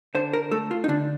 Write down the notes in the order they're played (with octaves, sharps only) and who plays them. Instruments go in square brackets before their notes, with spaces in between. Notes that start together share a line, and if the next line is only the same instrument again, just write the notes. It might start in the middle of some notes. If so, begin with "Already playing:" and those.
[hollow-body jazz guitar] D3 C5
A#4
A3 A4
F4
D#4
D3 D4